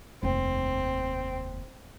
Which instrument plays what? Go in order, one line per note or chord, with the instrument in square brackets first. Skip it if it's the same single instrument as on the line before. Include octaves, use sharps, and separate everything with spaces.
[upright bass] F1 D#2 [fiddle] C4